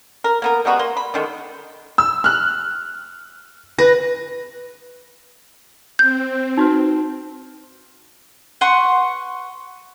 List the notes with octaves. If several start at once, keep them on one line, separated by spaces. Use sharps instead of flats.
A#4
A#3 B3 A#4
G3 G#3 B3 F#4
A#3 C6
B5
D3 D#3 G#3
E6
F6 F#6
B4 A#6
C4 G6
D#4 F#4 B4
B4 F#5 C6 C#6